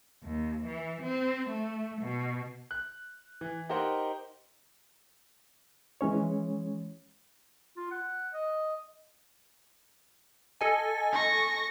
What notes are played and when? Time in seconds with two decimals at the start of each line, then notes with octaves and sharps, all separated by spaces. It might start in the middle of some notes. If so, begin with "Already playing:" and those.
0.23 D#2
0.66 E3
1.02 C4
1.50 A3
2.02 B2
2.71 F#6
3.41 E3
3.69 D#4 G4 A#4 C5 D#5 F#5
6.01 E3 G#3 C#4 C#5
7.77 F4
7.91 F#5
8.33 D#5
10.61 A4 D#5 G#5
11.12 C#6 A#6